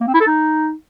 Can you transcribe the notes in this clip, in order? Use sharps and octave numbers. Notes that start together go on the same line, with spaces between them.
A#3
C4
E4
A4
D#4